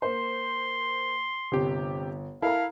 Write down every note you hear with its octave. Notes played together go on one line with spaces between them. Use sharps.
A#3 C5 C6
G1 C3 G4
E4 A4 A#4 F5 A#5